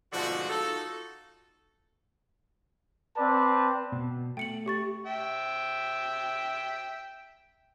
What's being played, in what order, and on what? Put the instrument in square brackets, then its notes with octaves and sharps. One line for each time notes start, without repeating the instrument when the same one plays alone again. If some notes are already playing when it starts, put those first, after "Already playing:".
[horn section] G#2 B2 D3 F3 A3 F#4
D#4 F4 F#4 A4
[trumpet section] C4 B4 D5 A5
[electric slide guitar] B2
[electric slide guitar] A3 [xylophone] G5 C#7 F#7
[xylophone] G4 C#6 A6
[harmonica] E5 G5